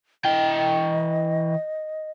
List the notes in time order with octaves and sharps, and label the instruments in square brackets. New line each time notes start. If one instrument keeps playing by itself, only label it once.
[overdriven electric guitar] E3 G5 [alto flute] D#5